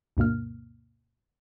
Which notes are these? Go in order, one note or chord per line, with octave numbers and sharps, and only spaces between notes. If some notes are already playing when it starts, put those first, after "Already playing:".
D2 G2 B2 A#3 F6